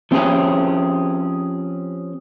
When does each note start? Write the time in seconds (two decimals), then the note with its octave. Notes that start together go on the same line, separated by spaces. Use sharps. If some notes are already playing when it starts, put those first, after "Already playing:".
0.11 F3 C4 C#4 G4 G#4